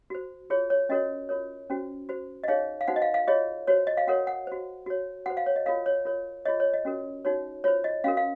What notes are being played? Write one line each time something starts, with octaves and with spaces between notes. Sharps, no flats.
F#4 C5
F4 G#4 C#5
C#5
C#4 F#4 A#4 C#5 D#5
F4 A#4 C#5
C#4 F#4 C5
F#4 C5
D#5
D#4 G#4 C#5 F5
F5
D#4 F#4 C5 F#5
D#5
F5
F5
F4 G#4 C#5 D#5
F#4 C5 C#5
D#5
F5
F#4 A#4 C#5 F#5
F#5
F#4 C5
F#4 C#5
F#4 C5 F#5
F5
C#5
D#5
F4 A#4 C#5 F5
C#5
F4 A#4 C#5
F4 G#4 C#5 D#5
C#5
D#5
C#4 F#4 A#4
D#4 F#4 C#5
F4 C5 C#5
D#5
C#4 F#4 A#4 F5
F5